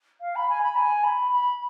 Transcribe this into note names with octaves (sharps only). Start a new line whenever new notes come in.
F5
B5
G#5
B5
G#5
B5
B5